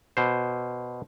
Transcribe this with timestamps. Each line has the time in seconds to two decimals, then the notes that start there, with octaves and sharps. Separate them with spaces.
0.17 B2 C5